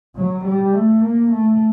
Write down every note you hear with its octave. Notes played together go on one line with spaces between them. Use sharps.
F#3
G3
A3
A#3
A3